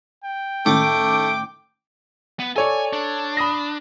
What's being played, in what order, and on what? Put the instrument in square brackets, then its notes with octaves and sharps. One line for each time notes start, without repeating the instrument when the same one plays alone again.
[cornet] G5
[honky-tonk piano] A2 D#3 C#4 [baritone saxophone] A3 [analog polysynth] D6
[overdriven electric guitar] B3
[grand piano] A4 C#5 D5 [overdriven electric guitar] G#5
[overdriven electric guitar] D4
[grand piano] B5 D#6 A#6